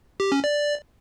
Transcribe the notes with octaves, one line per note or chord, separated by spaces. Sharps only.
G4
C#4
D5